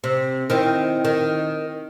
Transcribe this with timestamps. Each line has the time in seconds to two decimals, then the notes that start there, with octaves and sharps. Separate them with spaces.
0.04 C3
0.50 D#3 C4 E4
1.05 D#3